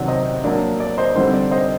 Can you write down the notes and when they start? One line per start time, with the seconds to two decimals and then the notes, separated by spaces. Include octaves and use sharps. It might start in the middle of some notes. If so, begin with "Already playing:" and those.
Already playing: C3 D#3 F#3 D5 F#5
0.08 C5 D#5
0.44 F#3 A#3 D4
0.80 D5
0.98 C5 D#5
1.15 D3 G3 C4 D#4 C5
1.34 D5
1.51 C5 D#5